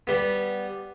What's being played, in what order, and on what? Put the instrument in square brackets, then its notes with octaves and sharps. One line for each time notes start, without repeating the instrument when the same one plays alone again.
[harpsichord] G3 B3